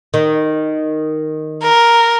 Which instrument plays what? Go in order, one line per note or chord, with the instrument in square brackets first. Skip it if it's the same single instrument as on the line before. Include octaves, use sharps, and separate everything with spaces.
[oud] D#3
[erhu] A#4